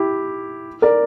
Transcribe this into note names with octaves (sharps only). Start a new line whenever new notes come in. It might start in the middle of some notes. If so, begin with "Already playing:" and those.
Already playing: E4 G4
A#4 D5